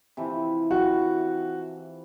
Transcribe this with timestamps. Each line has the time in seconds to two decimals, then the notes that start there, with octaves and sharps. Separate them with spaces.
0.17 C3 E3 F3
0.71 F#4